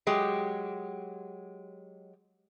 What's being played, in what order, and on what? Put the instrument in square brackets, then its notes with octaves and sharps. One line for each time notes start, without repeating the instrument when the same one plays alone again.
[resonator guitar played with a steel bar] F#3 G#3 G4